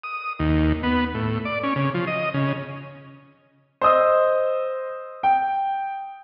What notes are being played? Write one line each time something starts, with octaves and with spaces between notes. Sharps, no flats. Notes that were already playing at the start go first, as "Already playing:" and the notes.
D#6
D#2
B3
A2
D5
C#4
C#3
F3
D#5
C#3
C5 D#5 D#6 E6
G5